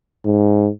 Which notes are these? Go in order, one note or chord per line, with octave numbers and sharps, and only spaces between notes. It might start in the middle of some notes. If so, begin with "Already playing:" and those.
G#2